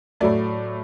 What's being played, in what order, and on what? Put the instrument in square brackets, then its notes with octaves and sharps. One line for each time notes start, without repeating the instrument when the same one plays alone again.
[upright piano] A2 F#3 A3 D5